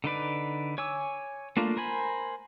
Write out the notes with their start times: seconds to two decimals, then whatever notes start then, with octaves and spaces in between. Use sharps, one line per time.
0.04 D3 D#4 B4 D5
0.78 C#5 G#5 D6 E6
1.57 A3 A#3 D4 F4
1.77 A#4 C5 G#5 B5